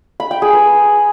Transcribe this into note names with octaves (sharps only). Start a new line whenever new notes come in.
B5
G5
G#4
B4